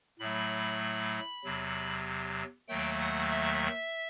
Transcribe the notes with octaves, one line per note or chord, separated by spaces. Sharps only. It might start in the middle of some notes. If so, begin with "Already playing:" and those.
A2 F#3 A3 B5
E2 C3 F#3
D#2 D#3 F#3 A3 G5
F#5
E5